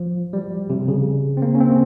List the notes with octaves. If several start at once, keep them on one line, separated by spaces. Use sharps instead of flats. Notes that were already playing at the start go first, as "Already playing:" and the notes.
Already playing: F3
G3
C3
C#3
C4
A#3
C#4
C4